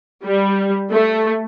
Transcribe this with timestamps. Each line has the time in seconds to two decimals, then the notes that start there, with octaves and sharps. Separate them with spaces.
0.24 G3
0.91 A3